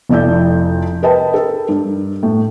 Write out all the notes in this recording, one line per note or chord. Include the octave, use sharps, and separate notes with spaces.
F1 F2 E4 D5 G6
A#4 B4 D#5 G5 A5 B5
A4 A#4
G2
A2